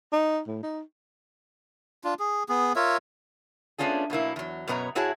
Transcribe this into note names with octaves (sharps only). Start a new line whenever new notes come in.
D#4
A2
D#4
D4 F4
G#4
B3 G#4
F4 A#4 C#5 E5
A3 B3 C#4 D4 F4 G#4
B2 F#3 A#3 E4
E2 F#3
F#2 B2 B3 C#5 A#5
A2 E4 F#4 G#4 C#5 A5